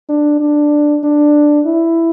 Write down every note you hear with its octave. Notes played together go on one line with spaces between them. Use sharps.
D4
D4
D4
E4